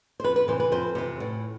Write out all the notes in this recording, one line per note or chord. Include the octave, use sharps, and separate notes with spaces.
C5
F2 B4
B4
C3 E3 C5
B4
F2 C5
C3 E3
A2